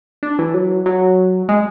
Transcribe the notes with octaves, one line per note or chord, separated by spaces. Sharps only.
D4
E3
F#3
F#3
G#3